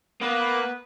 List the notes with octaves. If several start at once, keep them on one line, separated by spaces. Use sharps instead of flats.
A#3 B3 B4